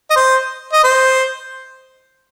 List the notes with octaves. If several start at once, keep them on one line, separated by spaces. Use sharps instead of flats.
D#5
C5
D#5
C5